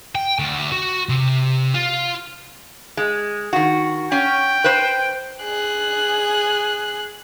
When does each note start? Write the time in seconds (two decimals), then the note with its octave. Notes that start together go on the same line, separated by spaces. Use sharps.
0.15 G5
0.39 D2
0.72 F#4
1.09 C3
1.74 F4
2.97 G#3
3.53 D#3 F#4
4.12 C#4 G5
4.64 B4 C5
5.44 G#4 F#6